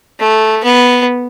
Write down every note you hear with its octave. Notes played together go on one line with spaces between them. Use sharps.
A3
B3